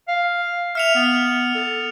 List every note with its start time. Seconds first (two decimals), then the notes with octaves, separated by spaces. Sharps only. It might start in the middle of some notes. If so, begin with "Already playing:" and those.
0.08 F5
0.75 E5 F6 C#7 F7
0.95 B3
1.55 A4